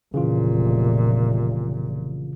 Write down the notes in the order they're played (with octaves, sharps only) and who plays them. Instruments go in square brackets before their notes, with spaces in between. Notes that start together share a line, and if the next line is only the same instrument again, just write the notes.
[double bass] F1 A#2 [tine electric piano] C#3 E3 F4